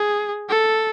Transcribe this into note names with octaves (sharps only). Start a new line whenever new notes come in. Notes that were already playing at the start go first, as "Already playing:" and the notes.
Already playing: G#4
A4